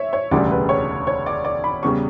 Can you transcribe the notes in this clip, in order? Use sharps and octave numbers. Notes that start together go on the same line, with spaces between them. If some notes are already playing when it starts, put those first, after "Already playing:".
Already playing: C#5 E5
C#5
E1 D2 C#3 G3 D5
B4
C#5
C#5
D5
D5
B5
E2 C#3 G3 C#6